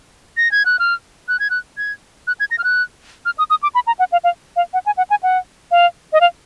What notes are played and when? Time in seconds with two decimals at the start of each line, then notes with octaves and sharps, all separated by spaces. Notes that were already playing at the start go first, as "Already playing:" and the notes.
0.37 A#6
0.52 G#6
0.66 F#6
0.79 F6
1.28 F#6
1.40 G#6
1.50 F#6
1.77 G#6
2.27 F#6
2.40 G#6
2.51 A#6
2.58 F6
2.64 F#6
3.25 F6
3.38 D#6
3.50 D#6
3.63 D6
3.75 B5
3.87 A#5
3.99 F#5
4.12 F5
4.24 F5
4.56 F5
4.74 F#5
4.86 G#5
4.97 F#5
5.10 G#5
5.23 F#5
5.71 F5
6.13 D#5
6.21 F5